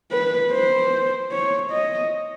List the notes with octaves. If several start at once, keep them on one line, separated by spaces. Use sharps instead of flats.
B4
C5
C#5
D#5